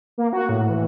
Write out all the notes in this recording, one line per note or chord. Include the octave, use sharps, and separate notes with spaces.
A#3
F#4
A2
E3